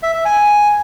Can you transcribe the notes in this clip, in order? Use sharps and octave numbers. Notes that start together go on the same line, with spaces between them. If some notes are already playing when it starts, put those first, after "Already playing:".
E5
E5
G#5